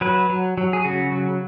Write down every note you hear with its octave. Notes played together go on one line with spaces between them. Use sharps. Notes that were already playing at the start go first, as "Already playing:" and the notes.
F#3 B4
F#3
F#3
G#4
C#3 F#4
F#3